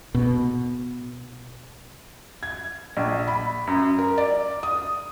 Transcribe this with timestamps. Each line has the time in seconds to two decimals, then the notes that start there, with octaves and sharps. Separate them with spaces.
0.15 B2
2.43 G#6
2.97 A#1
3.27 B5
3.67 F#2
3.99 A#4
4.18 D5
4.63 D#6